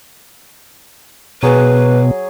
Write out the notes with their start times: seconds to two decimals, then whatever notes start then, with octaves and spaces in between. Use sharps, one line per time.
1.43 B2 F#3 G#4 B4